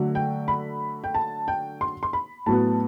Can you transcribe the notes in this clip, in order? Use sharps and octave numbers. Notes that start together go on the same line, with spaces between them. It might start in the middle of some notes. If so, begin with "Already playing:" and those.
Already playing: D3 F#3 A3
G5
B5
G5
A5
G5
C6
C6
B5
A2 F#3 B3 A5